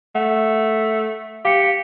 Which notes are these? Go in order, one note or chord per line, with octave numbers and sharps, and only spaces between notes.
A3 F#5
G4 F5 C#7